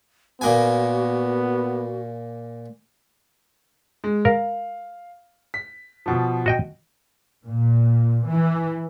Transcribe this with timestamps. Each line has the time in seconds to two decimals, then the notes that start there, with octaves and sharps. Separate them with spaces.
0.41 A#2 A#3 B3 F#4 G#5
4.04 G#3
4.25 A#4 F5
5.54 B6
6.06 B2 F3
6.46 F#4 D#5 G5
7.46 A#2
8.26 E3